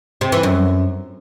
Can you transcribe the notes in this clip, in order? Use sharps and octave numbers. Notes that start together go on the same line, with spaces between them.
C3
E3
F#2